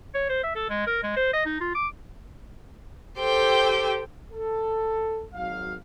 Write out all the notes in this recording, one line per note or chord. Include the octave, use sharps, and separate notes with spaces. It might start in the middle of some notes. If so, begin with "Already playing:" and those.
C#5
C5
E5
A4
G#3
A#4
G#3
C5
D#5
D#4
F4
D6
G4 A4 C5 G5
A4
G#1 F#3 F5